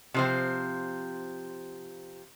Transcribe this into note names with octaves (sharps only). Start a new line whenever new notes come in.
C3 F3 C4